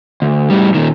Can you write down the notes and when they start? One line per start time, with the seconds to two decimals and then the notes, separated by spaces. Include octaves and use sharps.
0.22 D2
0.50 A2 G3
0.74 A#2 D#3